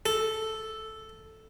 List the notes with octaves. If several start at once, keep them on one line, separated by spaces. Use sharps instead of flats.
A4